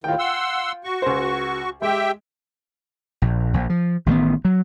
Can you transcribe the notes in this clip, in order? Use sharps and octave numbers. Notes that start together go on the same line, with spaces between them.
D#2 A2 D#3 F4 G5
F#5 C6 E6
F#4 C#6
C#2 C5
G#3 G4 E5 G5
A#1
A#1
F3
A1 D#3 G3 B3
F#3